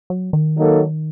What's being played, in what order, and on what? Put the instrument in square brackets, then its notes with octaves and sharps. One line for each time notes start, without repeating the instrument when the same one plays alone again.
[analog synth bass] F#3
D#3
[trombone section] F#3 A#3 D#4 A4